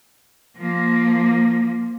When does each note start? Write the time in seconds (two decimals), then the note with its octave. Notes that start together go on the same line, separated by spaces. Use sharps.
0.58 F3 A#3